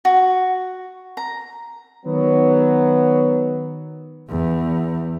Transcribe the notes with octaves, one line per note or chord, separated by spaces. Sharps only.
F#4
A#5
D#3 F#3 B3
E2